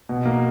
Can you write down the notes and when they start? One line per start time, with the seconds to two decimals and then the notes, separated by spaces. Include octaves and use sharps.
0.09 B2
0.25 A#3